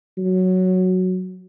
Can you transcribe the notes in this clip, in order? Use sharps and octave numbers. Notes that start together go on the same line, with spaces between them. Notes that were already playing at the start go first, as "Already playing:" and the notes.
F#3